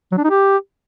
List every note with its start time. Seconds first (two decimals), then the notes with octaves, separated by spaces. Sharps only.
0.12 F#3
0.18 D4
0.24 D#4
0.30 G4